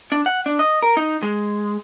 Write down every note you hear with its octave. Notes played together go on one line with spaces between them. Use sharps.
D4
F#5
D4
D#5
A#4
D#4
G#3